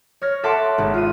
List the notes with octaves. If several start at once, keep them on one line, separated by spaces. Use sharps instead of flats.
C#5 F6 A#6
A4 E5 F#5 A5 C6 D6
G#1
F4 D#7